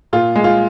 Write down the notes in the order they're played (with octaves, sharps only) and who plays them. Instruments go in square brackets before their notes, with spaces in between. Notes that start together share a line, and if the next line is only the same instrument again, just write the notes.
[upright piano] A#2 F4
G#3
F4